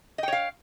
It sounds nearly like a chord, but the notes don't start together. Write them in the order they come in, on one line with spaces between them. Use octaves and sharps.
D#5 G5 C#5 F5